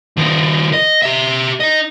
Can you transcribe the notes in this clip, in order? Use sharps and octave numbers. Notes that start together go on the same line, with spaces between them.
D#3 F3
D#5
G4 E5
D#4 D#5